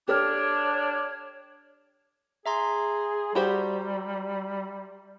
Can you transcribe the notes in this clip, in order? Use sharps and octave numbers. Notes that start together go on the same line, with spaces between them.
D4 G4 A4 C#5 F6
G#4 E5 A#5 C6
G3 F#4 G4 C5